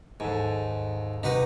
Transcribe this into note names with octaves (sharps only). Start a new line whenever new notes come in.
D#2 G#2 A4 G#5
C3 D#4 F#4 B4